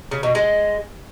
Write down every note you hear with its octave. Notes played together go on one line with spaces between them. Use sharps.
C#3
B2
G#3